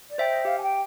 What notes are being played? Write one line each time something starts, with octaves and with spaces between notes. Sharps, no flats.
D5
C5 E5 G5
D#5
G4 F5
G#5
G5